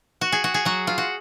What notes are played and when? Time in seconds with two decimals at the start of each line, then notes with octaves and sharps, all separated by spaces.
0.21 F#4
0.32 G#4
0.44 F#4
0.54 G#4
0.65 F#3 F#4
0.87 F4
0.98 F#4